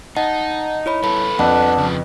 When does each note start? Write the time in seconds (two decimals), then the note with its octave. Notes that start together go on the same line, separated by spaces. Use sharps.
0.17 D#4 D#5 F#5 A5
0.86 E4 C#5 B5
1.04 B3 A4 B5
1.39 F2 D4 B4 F#5
1.79 C#3 F3